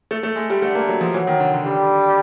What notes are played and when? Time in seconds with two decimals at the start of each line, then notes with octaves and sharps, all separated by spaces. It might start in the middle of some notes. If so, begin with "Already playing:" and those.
0.11 A3
0.23 A3
0.36 G#3
0.50 G3
0.62 D3 A3
0.75 A#3
0.89 F#3
1.01 F3
1.14 E3 F#3
1.27 D#3
1.40 D3
1.53 D3
1.66 D3 G3